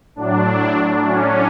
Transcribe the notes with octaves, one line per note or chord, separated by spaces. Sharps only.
A2 F#3 D4
C#4